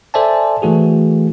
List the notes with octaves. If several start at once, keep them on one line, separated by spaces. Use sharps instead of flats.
A4 C5 D5 E5 G#5 A5
E3 A3 F#4 G#4